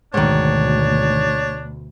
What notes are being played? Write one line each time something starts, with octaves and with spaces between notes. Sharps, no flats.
D2 G#2 B2 D#3 D4 C#5